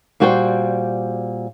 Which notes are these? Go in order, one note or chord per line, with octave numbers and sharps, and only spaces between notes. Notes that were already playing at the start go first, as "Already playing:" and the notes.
A#2 G3 F#4 C5 D5 G5